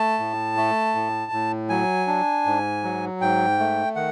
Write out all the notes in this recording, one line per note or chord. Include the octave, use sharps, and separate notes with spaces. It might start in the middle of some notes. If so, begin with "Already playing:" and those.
Already playing: A3 A5
A2
A3
A2
A2
F#3 G#5
D4
G#2
F#3
G#2 G5
A3
D#3 F#5